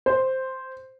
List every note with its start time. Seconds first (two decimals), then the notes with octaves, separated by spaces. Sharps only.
0.06 C5